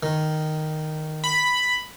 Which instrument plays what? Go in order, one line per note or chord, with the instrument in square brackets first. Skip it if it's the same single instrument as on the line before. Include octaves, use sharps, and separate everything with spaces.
[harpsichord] D#3
[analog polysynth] B5